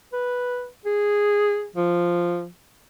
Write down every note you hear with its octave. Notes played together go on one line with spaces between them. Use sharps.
B4
G#4
F3